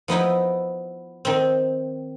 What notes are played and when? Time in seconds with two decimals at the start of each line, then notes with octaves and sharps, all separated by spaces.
0.08 F3 B3 D#4 E4
1.25 D#3 C4